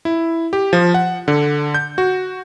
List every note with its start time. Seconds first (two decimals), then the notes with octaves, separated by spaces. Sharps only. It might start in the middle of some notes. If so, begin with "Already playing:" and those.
0.05 E4
0.53 G4
0.73 F3
0.94 F#5
1.28 D3
1.74 G6
1.98 F#4